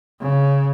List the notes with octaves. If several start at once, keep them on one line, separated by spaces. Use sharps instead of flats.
C#3